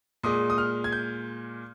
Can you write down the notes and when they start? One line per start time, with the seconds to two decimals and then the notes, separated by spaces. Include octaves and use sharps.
0.23 A#2 G#3 D#6
0.50 D#6
0.58 F6
0.84 G#6
0.92 G6